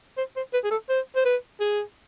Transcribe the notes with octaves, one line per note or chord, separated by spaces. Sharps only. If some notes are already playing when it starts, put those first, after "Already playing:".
C5
C5
B4
G#4
A4
C5
C5
B4
G#4